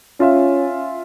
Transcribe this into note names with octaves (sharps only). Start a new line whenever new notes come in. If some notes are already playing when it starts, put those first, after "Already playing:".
C#4 F4 E5 F5